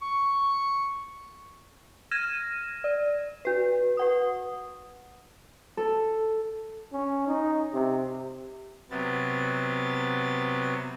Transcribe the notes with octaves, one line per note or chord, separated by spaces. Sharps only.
C#6
F6 G#6 A#6 D#7 E7
D5
F#4 B4
B4 F#5 D#6
A4
C#4
D#4
C3
C3 F#3 B3 A6